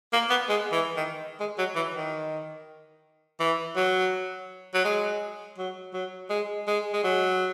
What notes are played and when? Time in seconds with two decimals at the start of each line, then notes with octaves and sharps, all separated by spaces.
0.13 A#3
0.30 B3
0.49 G#3
0.72 E3
0.96 D#3
1.40 G#3
1.58 F#3
1.75 E3
1.94 D#3
3.40 E3
3.76 F#3
4.74 F#3
4.85 G#3
5.58 F#3
5.93 F#3
6.30 G#3
6.67 G#3
6.93 G#3
7.04 F#3